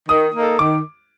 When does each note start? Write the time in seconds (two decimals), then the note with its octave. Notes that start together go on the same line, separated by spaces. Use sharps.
0.09 D#3 D#6
0.34 A#3 D#4 A4
0.59 D#3 D6